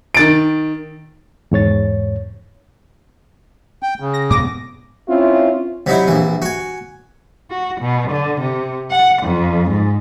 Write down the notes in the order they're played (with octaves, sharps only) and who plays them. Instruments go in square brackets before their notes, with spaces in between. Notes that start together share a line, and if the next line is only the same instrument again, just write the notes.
[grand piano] D#3 A6 D7
[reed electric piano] E2 G#2 C#5 A6
[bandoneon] G5
C#3
[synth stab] A#6
[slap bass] G#2 B2 B3 [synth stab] D6 A#6
[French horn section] C4 C#4 E4 F4
[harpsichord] C3 F#3 D#4 E4
A#1 E3
F#4 G#5
[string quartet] F#4
B2
D3
C3
F#5
F2
G#2